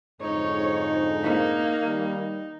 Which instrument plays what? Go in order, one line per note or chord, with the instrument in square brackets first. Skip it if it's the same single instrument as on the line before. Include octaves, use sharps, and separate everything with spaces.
[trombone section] F2 G#2 D3 [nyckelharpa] D#4 [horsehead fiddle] C#5
[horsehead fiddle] A#3
[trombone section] D#3 G3